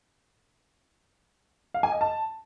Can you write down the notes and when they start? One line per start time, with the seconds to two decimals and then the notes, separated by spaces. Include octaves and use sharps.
1.74 F5
1.83 G#5
1.92 D#5
2.01 A5